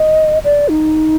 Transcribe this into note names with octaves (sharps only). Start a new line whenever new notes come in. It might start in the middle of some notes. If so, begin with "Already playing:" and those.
Already playing: D#5
D5
D#4